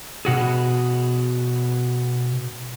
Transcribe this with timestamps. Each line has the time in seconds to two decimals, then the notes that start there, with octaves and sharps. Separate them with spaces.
0.25 B2 F#4 G#4